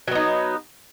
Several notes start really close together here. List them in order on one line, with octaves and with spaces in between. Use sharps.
F#3 B3 D#4